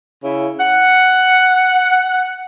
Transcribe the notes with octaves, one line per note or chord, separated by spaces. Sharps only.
C#3 E4
F#5